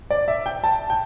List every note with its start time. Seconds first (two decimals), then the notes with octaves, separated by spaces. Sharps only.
0.11 D5
0.28 E5
0.46 G5
0.64 A5
0.90 G5